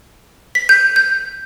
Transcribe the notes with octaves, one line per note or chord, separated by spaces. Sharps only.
B6
G6
G6